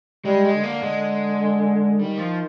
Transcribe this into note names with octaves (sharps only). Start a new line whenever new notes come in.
G3 G#3
G#3
D3
A#3
G#3
D#3 G3
F3